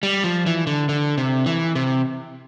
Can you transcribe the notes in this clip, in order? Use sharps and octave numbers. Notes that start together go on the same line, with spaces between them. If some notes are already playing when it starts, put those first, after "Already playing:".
G3
F3
E3
D3
D3
C3
E3
C3